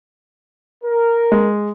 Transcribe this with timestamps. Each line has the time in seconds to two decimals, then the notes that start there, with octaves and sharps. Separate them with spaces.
0.84 A#4
1.32 G#3